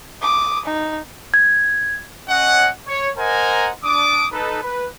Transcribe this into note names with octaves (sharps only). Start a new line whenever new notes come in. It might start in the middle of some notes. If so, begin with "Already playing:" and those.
D6 D#6
D#4
G#6
C#4 D#5 F#5
C#5
A#4 C5 D#5 F#5 G#5 A#5
D4 D6 D#6
D#4 A4 B4
B4